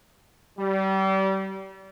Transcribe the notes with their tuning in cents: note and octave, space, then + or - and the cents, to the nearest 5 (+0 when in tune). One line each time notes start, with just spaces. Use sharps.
G3 -30